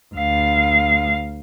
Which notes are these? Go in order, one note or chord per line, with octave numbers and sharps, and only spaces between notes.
D2 F5